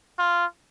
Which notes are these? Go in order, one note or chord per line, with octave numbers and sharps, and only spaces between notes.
F4